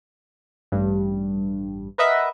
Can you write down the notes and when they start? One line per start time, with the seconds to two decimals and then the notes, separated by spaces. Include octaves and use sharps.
0.72 A1 G2
1.98 A#4 B4 D#5 E5 F#5